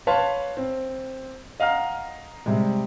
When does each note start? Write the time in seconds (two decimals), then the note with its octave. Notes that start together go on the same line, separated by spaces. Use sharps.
0.07 B4 C#5 F5 A5 B5 C6
0.57 C4
1.60 D#5 F5 F#5 A#5 F6
2.46 C3 G3 G#3